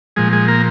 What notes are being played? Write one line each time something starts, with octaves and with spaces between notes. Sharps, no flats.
A#2 F3 G#3 G#4
G#3 G#4
A#3 A#4